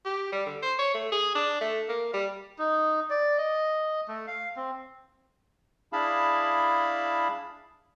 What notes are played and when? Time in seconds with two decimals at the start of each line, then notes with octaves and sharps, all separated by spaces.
0.05 G4
0.32 G3
0.46 D3
0.62 C5
0.79 C#5
0.94 A3
1.12 G#4
1.35 D4
1.61 A3
1.88 A#3
2.13 G3
2.59 D#4
3.10 D5
3.38 D#5
4.08 A3
4.28 F5
4.56 C4
5.93 D4 E4 G#4 F5 A5 B5